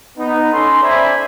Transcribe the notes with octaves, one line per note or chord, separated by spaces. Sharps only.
B3 D#4
C#4 A4 A#5 C6
C5 D5 E5 G#5 B5